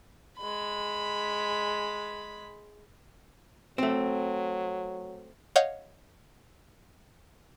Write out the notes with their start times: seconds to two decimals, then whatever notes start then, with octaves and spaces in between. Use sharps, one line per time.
0.38 G#3 B5
3.78 F#3 A3 C4
5.56 C#5 D#5 F5 F#5 G6